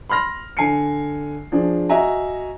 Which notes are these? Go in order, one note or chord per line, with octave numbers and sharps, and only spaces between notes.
B5 C6 F6 A#6
D3 G#5 C7 C#7
F3 D4 G#4
F#4 D#5 E5 G#5 A#5